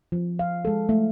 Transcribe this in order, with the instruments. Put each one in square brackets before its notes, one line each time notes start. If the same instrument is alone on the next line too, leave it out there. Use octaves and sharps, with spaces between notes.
[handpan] F3
F5
G#3 A4
A3